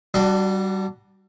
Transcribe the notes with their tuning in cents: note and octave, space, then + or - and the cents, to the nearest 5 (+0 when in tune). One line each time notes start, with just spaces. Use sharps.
G3 -25 D4 +10 F#4 +5